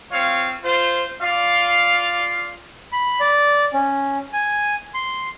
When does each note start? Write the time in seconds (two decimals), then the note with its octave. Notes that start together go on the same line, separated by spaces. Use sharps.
0.12 C4 F4 C#5 F5
0.64 F4 C5
1.21 F4 D5 F5
2.93 B5
3.20 D5
3.74 C#4
4.33 G#5
4.94 C6